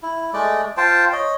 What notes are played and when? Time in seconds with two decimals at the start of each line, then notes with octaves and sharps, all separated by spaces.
0.03 E4
0.33 G#3 A3 D5
0.77 F4 C5 G5 A5
1.12 C#5 D#5